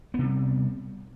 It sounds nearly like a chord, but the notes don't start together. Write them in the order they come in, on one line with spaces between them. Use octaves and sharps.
B3 C3 G3